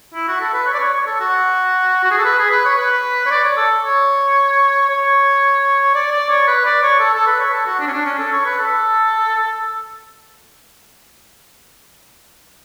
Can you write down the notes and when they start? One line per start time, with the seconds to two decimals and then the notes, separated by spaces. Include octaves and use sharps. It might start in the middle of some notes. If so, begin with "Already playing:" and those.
0.14 E4
0.28 F#4
0.41 A4
0.53 B4
0.67 C#5
0.74 D5
0.79 C#5
0.94 C#5
1.06 A4
1.20 F#4
2.04 F#4
2.11 G#4
2.18 A4
2.25 B4
2.39 G#4
2.51 B4
2.65 C#5
2.78 B4
3.26 C#5
3.31 D5
3.44 C#5
3.57 A4
3.84 C#5
4.89 C#5
5.95 D5
6.12 D5
6.30 C#5
6.47 B4
6.65 D5
6.83 C#5
7.00 A4
7.13 A4
7.27 B4
7.40 C#5
7.53 A4
7.66 F#4
7.80 D4
7.88 C#4
7.93 D4
8.06 C#4
8.18 A4
8.32 C#5
8.45 B4
8.59 A4